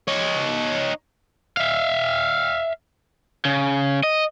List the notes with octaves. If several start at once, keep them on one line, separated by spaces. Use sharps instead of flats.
D#4 C#5
E5 F5
C#3
D#5